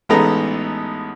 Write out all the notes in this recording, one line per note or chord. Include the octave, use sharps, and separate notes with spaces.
A1 G#3 B3 D#4 A4 A#5